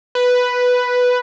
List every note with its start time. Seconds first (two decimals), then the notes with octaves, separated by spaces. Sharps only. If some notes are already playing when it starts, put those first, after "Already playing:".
0.15 B4